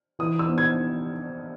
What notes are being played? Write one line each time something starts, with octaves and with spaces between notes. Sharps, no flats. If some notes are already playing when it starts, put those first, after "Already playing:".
E3 D#6
E6
B3
G#6